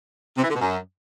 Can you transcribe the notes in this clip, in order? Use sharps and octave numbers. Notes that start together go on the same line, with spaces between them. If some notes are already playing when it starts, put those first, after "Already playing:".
C3
E3
D3
B2
F#2